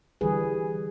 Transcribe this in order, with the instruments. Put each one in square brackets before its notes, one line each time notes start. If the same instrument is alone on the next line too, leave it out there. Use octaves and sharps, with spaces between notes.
[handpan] D3 E3 G3 G#4 B4